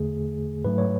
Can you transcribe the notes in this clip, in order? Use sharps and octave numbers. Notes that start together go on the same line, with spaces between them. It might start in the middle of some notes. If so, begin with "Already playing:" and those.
Already playing: E2 D3 A3 G#4
G#2 F#3 A3 B4
C#5